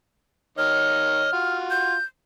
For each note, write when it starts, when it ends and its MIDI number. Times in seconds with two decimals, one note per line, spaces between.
0.58 1.30 51
0.58 1.30 73
0.58 1.30 75
0.58 1.55 89
1.33 1.94 65
1.33 1.94 66
1.71 2.04 91